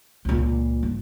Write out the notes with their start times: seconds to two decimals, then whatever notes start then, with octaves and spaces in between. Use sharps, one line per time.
0.25 C#2 A#2
0.83 G1